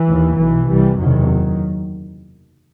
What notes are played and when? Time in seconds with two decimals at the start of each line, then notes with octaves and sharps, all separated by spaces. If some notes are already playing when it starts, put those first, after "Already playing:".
Already playing: E3
0.09 D#2
0.39 B1 B2 E3
0.69 C2 C3 E3 G3
0.99 F#1 E2 C3 D#3 F#3